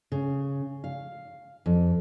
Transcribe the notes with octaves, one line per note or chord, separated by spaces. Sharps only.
C#3
F5
F2